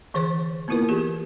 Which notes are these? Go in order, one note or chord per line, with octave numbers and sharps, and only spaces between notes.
D3 E3 G#4 B4 C5 C6
A#3 B3 E4 F4 A#4 B4
E3 B3 G4 G#4